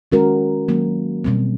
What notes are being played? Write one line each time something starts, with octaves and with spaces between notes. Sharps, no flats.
D#3 G#3 C#4 F#4 A#4
D#3 F#3 A#3
B2 G3 C4